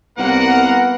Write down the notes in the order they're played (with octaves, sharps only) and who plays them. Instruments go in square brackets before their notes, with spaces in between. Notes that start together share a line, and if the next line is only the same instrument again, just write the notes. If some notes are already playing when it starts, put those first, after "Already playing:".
[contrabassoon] C2 [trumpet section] A#3 A#4 F#5 [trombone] B3